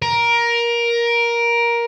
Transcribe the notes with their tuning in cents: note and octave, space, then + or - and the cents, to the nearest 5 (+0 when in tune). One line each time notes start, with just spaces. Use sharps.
A#4 +15